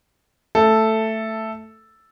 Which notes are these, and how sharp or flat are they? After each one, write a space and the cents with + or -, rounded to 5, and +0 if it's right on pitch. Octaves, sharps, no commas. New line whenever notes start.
A3 +10 A4 +0